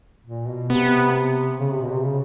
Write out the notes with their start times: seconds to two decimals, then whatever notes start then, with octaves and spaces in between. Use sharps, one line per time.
0.26 A#2
0.49 B2
0.70 C3 B3
1.59 C#3
1.70 C3
1.82 B2
1.92 C3
2.03 C#3